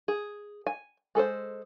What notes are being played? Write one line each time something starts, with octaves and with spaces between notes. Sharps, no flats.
G#4
G#5
G#3 A4 B4 C5